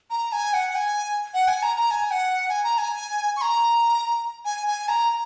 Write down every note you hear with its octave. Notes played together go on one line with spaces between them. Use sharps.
A#5
G#5
F#5
G#5
F#5
G#5
A#5
A#5
G#5
G#5
F#5
G#5
A#5
G#5
C#6
A#5
G#5
G#5
A#5